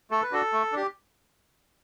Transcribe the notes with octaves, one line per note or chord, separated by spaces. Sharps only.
A3 A4
B4
D4 F#4 A4
A3
D4 G4